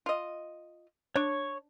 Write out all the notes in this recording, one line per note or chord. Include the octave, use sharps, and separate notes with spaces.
F4 D#5
D4 C#5 C#6